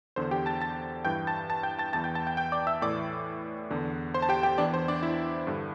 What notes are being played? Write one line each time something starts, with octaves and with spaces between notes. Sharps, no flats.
E2 D3 C5
G4 G5
A5 A6
A5 A6
G2 E3 G5 G6
A5 A6
A5 A6
G5 G6
A5 A6
E2 E3 A5 A6
G5 G6
A5 A6
G5 G6
G5 G6
D5 D6
E5 E6
A2 E3 D5 D6
E2 D3
C5 C6
A5
G4 G5
G4 G5
E2 E3 D4 D5
C5
D4 D5
E4 E5
G2 D3